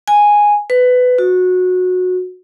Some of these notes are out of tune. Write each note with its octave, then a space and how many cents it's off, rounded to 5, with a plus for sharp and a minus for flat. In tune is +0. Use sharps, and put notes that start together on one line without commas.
G#5 -5
B4 +20
F#4 -20